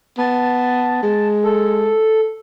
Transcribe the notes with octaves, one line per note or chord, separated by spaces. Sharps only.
B3 A5
G#3
A4